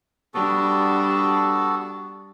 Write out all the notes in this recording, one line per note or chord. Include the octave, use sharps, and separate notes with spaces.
G3 B3 D4 F#4 A4